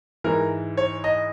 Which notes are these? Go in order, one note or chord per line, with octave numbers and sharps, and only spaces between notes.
G#2 E3 A#4
C#5
D#5